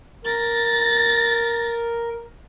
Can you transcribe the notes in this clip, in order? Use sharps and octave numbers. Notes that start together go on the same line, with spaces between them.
A#4 A6 A#6